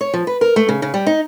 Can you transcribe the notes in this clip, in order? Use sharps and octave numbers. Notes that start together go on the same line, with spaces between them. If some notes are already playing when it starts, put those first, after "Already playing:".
C#5
F3
B4
A#4
A3
C#3
C#3
G3
D#4